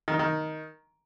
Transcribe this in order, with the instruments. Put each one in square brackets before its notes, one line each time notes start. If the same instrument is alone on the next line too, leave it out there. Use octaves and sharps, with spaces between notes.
[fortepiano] D#3
D#4
D#3